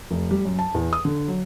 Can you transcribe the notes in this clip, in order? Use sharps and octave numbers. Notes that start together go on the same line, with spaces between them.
F1
G3
F#2
A5
E2
D#6
D3
F#3